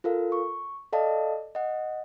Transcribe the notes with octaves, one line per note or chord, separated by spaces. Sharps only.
F4 A4 A#4 F5
C#6
A4 D5 D#5 F5 A5
D#5 F#5